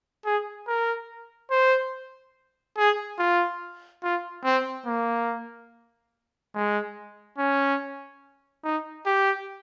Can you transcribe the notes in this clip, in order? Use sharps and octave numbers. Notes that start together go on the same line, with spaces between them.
G#4
A#4
C5
G#4
F4
F4
C4
A#3
G#3
C#4
D#4
G4